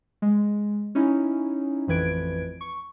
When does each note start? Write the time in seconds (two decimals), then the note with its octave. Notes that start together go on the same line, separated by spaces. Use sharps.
0.22 G#3
0.95 C#4 D#4 E4
1.87 A1 F2 E3 B4 G#6 D7
2.61 C#6